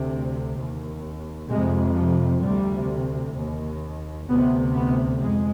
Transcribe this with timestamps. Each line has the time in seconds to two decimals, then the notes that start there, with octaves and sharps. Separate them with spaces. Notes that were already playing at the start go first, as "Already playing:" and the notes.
Already playing: D2 C3
0.57 D#2
1.49 F2 C3 G#3
1.97 F3
2.43 D2 C3 G3
3.36 D#2
4.28 D2 C3 B3
4.75 B3
5.22 F2 G#3